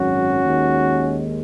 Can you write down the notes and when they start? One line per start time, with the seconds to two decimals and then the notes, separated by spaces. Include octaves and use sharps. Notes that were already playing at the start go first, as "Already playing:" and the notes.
Already playing: G#1 F#2 F#3 C#4 F#4
0.44 D#2 D#3 G#3